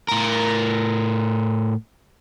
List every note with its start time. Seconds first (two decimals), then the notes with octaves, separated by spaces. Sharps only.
0.08 A2 A#4